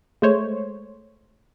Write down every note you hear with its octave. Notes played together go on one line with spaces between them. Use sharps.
G#3 A3 C5 C#5